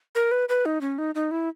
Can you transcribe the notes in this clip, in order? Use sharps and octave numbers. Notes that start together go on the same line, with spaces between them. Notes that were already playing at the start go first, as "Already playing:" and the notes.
A#4
B4
B4
D#4
C#4
D#4
D#4
E4